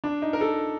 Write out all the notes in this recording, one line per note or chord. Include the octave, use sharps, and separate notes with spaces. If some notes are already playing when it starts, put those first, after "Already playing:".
D4
D#4
A#4
A4